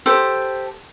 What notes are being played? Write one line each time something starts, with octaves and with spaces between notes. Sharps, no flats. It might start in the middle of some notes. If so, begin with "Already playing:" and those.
G4 A4 C5